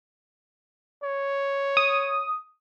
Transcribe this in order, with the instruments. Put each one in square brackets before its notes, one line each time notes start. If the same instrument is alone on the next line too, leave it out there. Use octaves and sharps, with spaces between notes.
[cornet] C#5
[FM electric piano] D#6